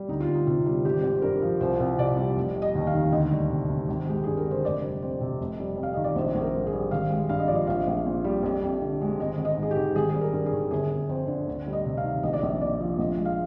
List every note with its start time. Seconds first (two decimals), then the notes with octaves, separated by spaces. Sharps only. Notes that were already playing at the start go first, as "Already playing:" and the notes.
Already playing: G3
0.08 D2 D#4
0.20 F4
0.28 D2
0.34 D#4
0.47 C3 F4
0.66 G3
0.84 G#1 G4
1.03 G#1
1.13 C5
1.22 G2 A#4
1.42 F3
1.61 C2 C5
1.80 C2
1.98 C3 D5
2.17 G3
2.36 F1
2.56 G3
2.62 D#5
2.75 D#2
2.87 F5
2.94 D#3
3.12 D2 D#5
3.31 G3
3.50 C3
3.70 D#3
3.89 G#1
4.08 G#3 G4
4.24 G2 G#4
4.37 A#4
4.46 D3 C5
4.64 F1 D5
4.83 G3
5.02 F2 C5
5.21 C3
5.40 F1
5.60 G3
5.77 F2
5.83 F5
5.94 D#3 D#5
6.04 D5
6.16 A#1 C5
6.35 A#1 C5
6.41 A#4
6.55 G#2
6.67 G#4
6.73 G3
6.91 G#1 F5
7.11 G#3
7.29 G2 F5
7.39 D#5
7.47 F3 D5
7.55 D#5
7.67 A#1 F5
7.87 A#1
8.06 A#2
8.24 G3
8.43 F2
8.62 F2
8.81 D3
9.01 G#3
9.19 G#1 D#5
9.38 G#1
9.45 D#5
9.57 G#2
9.63 G#4
9.71 G4
9.76 D#3
9.96 G#1 G#4
10.09 G#4
10.15 G3
10.21 A#4
10.33 G2
10.46 G#4
10.53 D#3
10.71 G1 G#4
10.90 G1
11.09 F2 C5
11.28 D3
11.48 D2
11.67 G3
11.73 D#5
11.85 C3
11.97 F5
12.04 D#3
12.23 A#1 D#5
12.33 D5
12.41 A#1 D#5
12.61 A#2 D5
12.81 F3
12.99 A#1 D#5
13.18 G#3
13.25 F5